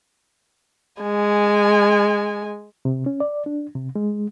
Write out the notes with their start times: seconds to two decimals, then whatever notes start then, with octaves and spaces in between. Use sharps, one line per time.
1.03 G#3 G#5
2.85 C3
3.06 C#4
3.20 D5
3.46 D4
3.75 C3
3.96 G#3